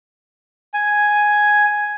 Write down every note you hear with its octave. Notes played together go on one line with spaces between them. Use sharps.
G#5